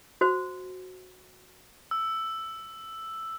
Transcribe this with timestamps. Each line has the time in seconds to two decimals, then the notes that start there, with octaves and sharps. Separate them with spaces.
0.21 F#4 C5
1.91 E6